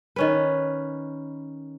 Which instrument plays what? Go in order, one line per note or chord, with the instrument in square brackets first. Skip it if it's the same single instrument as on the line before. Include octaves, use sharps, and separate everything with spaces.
[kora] D#3 C#4 B4